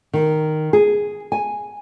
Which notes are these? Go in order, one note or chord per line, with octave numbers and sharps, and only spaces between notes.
D#3
G#4
G#5